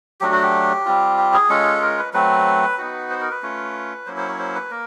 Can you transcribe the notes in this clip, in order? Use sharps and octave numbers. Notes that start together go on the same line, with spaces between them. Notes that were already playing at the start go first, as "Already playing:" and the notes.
F#3 A3 D4 F#4 G4
F#4
G4
G3 C4 F4
G4
G#4
G#3 C#4 F4 A4
A#4
B4
F#3 A3 C4 B4
B3 D#4 F#4
C5
A#4
B4
A3 C#4 F4
F#3 A#3 C#4 E4 C5
C5
C#5
C5
B4
A#3 A#4